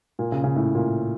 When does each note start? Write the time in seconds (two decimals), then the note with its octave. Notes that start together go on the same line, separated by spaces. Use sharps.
0.19 A#2
0.32 C#3
0.44 C#3
0.56 A2
0.75 A#2